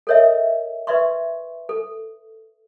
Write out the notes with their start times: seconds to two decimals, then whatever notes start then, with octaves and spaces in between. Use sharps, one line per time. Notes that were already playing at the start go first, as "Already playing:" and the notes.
0.07 A4 A#4 C#5 D#5 E5
0.87 B4 D5 E5 C6 C#6
1.69 A4